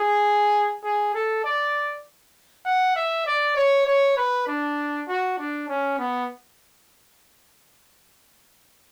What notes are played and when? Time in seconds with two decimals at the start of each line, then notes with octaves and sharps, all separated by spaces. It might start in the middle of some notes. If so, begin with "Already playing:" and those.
Already playing: G#4
0.84 G#4
1.15 A4
1.44 D5
2.65 F#5
2.96 E5
3.26 D5
3.56 C#5
3.87 C#5
4.17 B4
4.47 D4
5.08 F#4
5.38 D4
5.69 C#4
5.99 B3